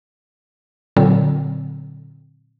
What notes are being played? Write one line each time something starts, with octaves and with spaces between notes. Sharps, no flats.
A#2 D3 F#3 C4